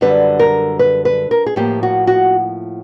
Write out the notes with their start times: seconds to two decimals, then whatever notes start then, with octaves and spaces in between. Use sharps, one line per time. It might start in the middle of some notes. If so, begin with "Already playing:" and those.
0.01 F#2 D3 G3 B4
0.39 A#4
0.79 B4
1.05 B4
1.31 A#4
1.46 G#4
1.56 A2 F3 A#3 G4
1.83 F#4
2.07 F#4